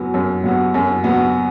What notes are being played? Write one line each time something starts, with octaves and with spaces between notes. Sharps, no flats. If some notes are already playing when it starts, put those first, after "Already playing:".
Already playing: F#2 F#3 B3 F#4
F#2
F#3 B3 F#4
F#2
F#3 B3 F#4